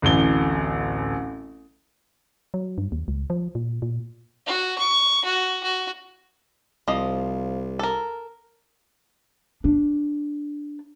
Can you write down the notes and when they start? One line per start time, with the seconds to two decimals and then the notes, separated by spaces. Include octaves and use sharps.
0.02 D1 A1 G7
2.54 F#3
2.78 G2
2.92 D#2
3.08 C#2
3.30 F3
3.55 A#2
3.82 A#2
4.47 F#4
4.78 C#6
5.25 F#4
5.63 F#4
6.88 C2 F3 D#5
7.79 A4 A#4
9.64 D4